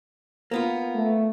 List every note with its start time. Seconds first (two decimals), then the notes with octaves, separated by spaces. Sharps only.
0.51 A#3 B3 F4
0.95 A3